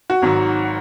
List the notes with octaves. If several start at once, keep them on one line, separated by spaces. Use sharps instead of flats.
F#4
G#1 G#2 F#3